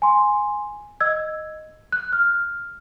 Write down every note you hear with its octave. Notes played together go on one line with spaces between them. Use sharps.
G#5 C6
D#5 E6 G#6
F#6
F6